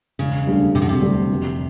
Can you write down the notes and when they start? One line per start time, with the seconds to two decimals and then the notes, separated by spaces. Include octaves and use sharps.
0.19 E1 C#3
0.47 D2 D3 G3
0.74 E1 C3
0.81 B2
0.89 C3
1.02 D2 D3 G3
1.30 F1